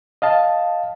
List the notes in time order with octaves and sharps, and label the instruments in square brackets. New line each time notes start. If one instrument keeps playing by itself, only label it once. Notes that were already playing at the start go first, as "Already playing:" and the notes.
[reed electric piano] D#5 F5 A5